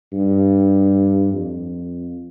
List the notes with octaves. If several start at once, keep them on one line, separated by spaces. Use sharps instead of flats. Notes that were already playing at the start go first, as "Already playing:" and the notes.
G2
F2